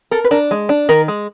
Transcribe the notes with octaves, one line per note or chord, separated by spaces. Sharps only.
A4 A#4
B4
D4 A#4
G#3
D4
D#3 A#4
G#3